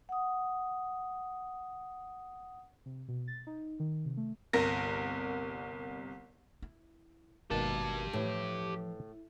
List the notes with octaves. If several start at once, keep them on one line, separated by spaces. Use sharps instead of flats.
F#5 D#6
C3
B2
A6
D#4
D#3
C3
A3
G1 C2 A#4 A#6
E4
G1 B2 D#3 G#3 A#3 G4 A5
A2 E3 F3 A4 B4